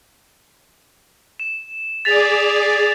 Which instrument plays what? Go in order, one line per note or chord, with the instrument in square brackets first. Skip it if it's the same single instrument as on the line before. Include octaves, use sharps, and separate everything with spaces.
[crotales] E7
[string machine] G#4 D5 [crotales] A6 B6 F7